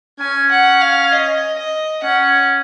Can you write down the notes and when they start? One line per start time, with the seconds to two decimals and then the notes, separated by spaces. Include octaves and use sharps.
0.20 C#4 G#5
0.52 F#5
0.81 F5
1.12 D#5
1.58 D#5
2.04 C#4 F#5